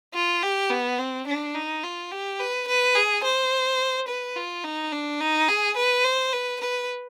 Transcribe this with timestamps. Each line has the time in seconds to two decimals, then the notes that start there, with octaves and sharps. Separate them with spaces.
0.15 F4
0.43 G4
0.70 B3
0.99 C4
1.27 D4
1.55 D#4
1.83 F4
2.11 G4
2.40 B4
2.68 B4
2.95 G#4
3.24 C5
4.08 B4
4.36 F4
4.64 D#4
4.92 D4
5.21 D#4
5.49 G#4
5.77 B4
6.04 C5
6.33 B4
6.61 B4